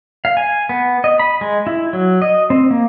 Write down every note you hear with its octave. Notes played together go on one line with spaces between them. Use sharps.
F5
G#5
B3
D#5
B5
G#3
E4
F#3
D#5
C4
A#3